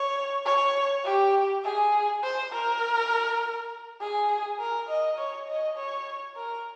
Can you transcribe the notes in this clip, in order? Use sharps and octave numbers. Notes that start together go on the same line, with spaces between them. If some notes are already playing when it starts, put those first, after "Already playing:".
Already playing: C#5
C#5
G4
G#4
C5
A#4
G#4
A#4
D#5
C#5
D#5
C#5
A#4